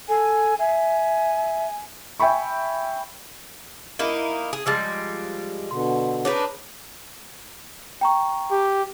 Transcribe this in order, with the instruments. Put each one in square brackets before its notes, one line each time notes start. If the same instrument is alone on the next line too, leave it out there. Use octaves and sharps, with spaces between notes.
[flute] A4 [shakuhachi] G#5
[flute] E5 [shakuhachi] G#5
[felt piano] E5 G5 G#5 B5 C#6
[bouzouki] A#3 D#4 E4
G#4
[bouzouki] F3 G3 G#3 [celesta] E6 A6
[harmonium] B2 D3 [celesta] C6
[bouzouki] D4 D#4 B4 [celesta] G#4 C#5
[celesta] G5 A#5 C#6
[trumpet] G4